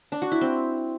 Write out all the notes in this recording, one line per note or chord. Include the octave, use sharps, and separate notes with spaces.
D4
F#4
E4
C4